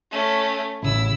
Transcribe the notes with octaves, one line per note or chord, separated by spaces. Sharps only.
A3 C#4
A1 C#3 E4 E6